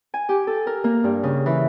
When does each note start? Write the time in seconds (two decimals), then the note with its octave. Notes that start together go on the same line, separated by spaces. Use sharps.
0.14 G#5
0.29 G4
0.47 A4
0.67 A#4
0.84 A#3
1.04 G2
1.23 C#3
1.46 E3